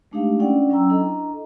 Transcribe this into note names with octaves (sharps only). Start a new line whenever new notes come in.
G#3 A3 D4 D#4 G4 F5
C#4 D4 E4 D5 F#5 G5
F#3 C#4 G5 A#5 E6
D4 E4 A4 D#5 A#5